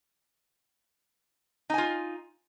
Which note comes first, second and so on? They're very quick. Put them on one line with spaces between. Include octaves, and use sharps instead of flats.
D#4 G#5 F4